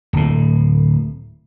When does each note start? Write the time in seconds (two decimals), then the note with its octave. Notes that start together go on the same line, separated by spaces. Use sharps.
0.13 D1 A2